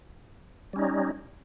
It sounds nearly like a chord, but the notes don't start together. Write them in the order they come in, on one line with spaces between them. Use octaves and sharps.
G3 C#4 D#4